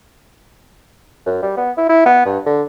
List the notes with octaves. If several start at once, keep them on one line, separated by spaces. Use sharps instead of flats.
F#2
G3
B3
E4
E4
B3
G2
D3